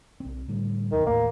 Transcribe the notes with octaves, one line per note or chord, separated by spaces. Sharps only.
B1 C4
A2 D3 G3
D1 E2 B2 D#3
G#1 D#2 A2 A#3